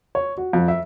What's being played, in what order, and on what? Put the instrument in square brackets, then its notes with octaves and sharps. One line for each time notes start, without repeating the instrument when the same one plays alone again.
[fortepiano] C#5
F#4
F2
E5